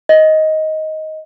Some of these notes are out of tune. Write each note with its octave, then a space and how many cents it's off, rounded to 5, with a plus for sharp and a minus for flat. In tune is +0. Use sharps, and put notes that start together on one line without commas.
D#5 +10